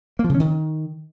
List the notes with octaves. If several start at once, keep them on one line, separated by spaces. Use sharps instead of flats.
A#3
F3
C#3
C#4
D#3